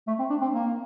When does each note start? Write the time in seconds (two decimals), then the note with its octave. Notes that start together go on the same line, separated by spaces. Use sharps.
0.07 A3
0.19 C4
0.30 D4
0.41 C4
0.53 A#3